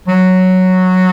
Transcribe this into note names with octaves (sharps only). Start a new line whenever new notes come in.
F#3